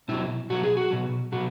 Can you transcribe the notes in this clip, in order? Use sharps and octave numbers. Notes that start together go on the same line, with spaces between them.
B2 F#3 E4
B2 F#3 F#4
G#4
F#4
B2 F#3
B2 F#3 F#4